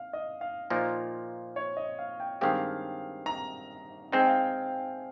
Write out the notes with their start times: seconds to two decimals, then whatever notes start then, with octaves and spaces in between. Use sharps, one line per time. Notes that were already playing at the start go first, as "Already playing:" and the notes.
Already playing: F5
0.13 D#5
0.41 F5
0.70 A#2 F3 A#3 D#4 A#4
1.56 C#5
1.77 D#5
1.99 F5
2.20 G5
2.41 G2 D#3 G#3 C4 G4 F5
3.26 A#5
4.12 G#3 C4 D#4 G#5
4.19 G5
4.27 F5
4.34 G5